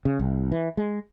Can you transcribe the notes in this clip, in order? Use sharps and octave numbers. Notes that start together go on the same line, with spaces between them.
C#3
C2
E3
G#3